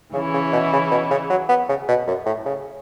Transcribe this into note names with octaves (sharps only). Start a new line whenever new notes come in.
C#3 E3 C#4 E4
C#3
B2
C#3
B2
C#3
F#3
B3
C#3
B2
F#2
A2
C#3